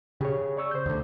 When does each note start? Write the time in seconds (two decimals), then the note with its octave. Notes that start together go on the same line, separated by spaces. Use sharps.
0.21 C#3 G4 G#4 C#5
0.57 D5 C#6 E6
0.71 C5 G6
0.86 D2 D3